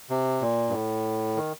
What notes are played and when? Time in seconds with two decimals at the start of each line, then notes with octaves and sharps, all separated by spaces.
0.10 C3
0.41 A#2
0.69 G2
0.73 A2
1.36 D#3